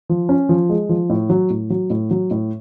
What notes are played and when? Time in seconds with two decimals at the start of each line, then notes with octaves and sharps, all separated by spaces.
0.09 F3
0.29 C#4
0.49 F3
0.69 G#3
0.89 F3
1.10 A2
1.30 F#3
1.50 A2
1.70 F#3
1.90 A2
2.11 F#3
2.31 A2